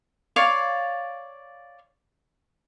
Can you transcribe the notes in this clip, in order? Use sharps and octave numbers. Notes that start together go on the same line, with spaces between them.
C#5 D5 F5 D6